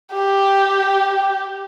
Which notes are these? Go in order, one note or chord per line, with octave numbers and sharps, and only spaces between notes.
G4